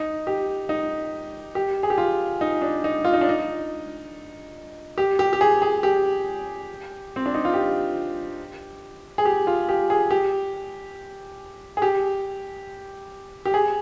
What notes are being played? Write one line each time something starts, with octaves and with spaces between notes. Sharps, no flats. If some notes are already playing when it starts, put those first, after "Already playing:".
Already playing: D#4
G4
D#4
G4
G#4
G4
F4
D#4
D4
D#4
F4
D#4
D4
D#4
G4
G4
G4
G#4
G#4
G4
C4
D4
D#4
F4
G4
G#4
G4
F4
G4
G#4
G4
G#4
G4
G4
G#4